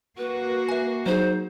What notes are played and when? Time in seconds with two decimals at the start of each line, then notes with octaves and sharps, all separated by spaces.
0.18 A#3 F#4 B4
0.69 E5 G#5
1.06 F#3 D#4 G#4 C5